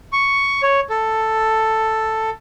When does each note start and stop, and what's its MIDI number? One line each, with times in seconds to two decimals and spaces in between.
0.13 0.62 85
0.63 0.80 73
0.90 2.30 69